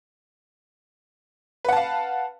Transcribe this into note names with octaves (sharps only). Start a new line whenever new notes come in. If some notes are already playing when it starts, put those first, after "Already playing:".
B4 F5 F#5 A5